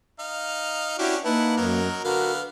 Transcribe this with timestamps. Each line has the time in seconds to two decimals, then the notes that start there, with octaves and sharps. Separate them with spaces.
0.19 D#4 F5
0.99 C#4 D4 E4 F#4 G4
1.25 A#3 D#4 E4 B4 F#5 A5
1.57 F#2 F#3 D#4 A#4
2.05 D3 B3 F#4 A#4 B4 F5